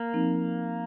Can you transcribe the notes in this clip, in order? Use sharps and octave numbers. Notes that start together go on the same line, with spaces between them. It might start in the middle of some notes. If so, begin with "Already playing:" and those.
Already playing: A#3
F3 C4 D#4